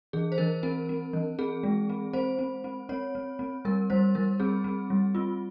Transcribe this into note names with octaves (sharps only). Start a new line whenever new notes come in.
E3 G#4
C5
E3 A#4
C4 A#4
C4
E3
C4 G#4
G#3
C4
C4 C5
C4
C4
C4 C#5
C4
C4
G3 A#4
G3 C5
G3 A#4
C4 G#4
C4
G3
C4 F4